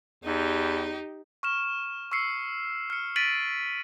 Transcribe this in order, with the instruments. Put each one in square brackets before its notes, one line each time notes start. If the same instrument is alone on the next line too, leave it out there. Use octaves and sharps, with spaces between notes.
[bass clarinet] E2 [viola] D#4 G4
[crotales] C#6 F6 E7
C#6 E6 C7 C#7
F6 C#7
A6 B6 D7 D#7 F#7